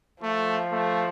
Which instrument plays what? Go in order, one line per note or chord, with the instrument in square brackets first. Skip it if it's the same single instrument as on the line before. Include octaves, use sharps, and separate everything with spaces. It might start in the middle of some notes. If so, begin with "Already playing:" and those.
[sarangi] F3 [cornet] A3
[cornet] A3